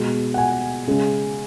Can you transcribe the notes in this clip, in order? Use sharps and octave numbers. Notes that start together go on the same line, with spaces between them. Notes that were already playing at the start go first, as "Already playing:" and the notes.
Already playing: B2 G#3
F#5
G#5
C#3 G#3